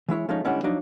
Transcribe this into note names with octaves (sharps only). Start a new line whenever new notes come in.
E3 G#3 E4 C#5
F3 G#3 A3 C#4 D#4
D3 G3 G#3 C#4 E4 F#5
F3 F#3 D4 D#4